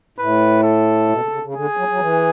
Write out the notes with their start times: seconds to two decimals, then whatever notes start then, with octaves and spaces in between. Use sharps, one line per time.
0.18 A2 B4
0.64 A4
1.09 B2
1.21 C#3
1.31 C#3
1.42 C#3
1.54 D3 G#4
1.77 F#3
1.88 F#3
2.00 E3